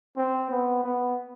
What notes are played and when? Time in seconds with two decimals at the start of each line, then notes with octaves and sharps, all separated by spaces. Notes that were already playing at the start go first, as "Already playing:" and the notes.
0.16 C4
0.51 B3
0.84 B3